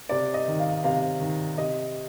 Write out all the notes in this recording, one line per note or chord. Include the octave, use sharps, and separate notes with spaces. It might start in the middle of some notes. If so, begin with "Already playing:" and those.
C3 D5
D#5
D#3
F5
C3 F5
D#3
C3 D#5